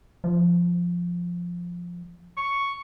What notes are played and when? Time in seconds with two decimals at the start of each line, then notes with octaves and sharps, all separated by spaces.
0.24 F3
2.37 C#6